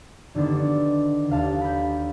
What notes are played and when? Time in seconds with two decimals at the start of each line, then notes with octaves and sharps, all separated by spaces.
0.35 D3 D#3 B3 D4
1.29 D#2 D3 F5 A5
1.61 B5 G6